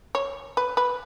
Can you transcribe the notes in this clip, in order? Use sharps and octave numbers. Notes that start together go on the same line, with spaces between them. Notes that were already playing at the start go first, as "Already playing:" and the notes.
C#5
B4
B4